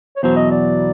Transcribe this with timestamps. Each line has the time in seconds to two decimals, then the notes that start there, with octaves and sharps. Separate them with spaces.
0.17 C#5
0.23 E2 B2 F#3 C5
0.36 D#5
0.51 D5